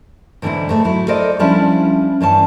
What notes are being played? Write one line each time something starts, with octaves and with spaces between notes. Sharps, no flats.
G#2 D3 E3 G#3 C4 E4
G#2 A3
F#3 E4
A4 A#4 C5 D5 D#5
F3 G3 C#4 D4 E4
G2 E3 C#4 A5